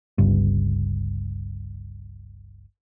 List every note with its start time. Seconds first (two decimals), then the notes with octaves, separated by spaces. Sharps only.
0.18 G1 C#2 G2